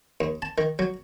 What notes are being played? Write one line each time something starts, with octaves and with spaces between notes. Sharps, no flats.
D#2
A5
D#3
F#3